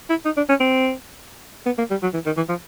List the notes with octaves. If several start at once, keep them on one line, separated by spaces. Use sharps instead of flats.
E4
D#4
D4
C#4
C4
B3
A#3
G3
F#3
E3
D#3
E3
F3